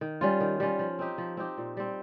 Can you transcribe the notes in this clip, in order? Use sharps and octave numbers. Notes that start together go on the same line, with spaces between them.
D#3
G3 C#4 F4
D#3
G3 C#4 F4
F3
C4 D#4 G4
F3
C4 D#4 G4
A#2
G3 C4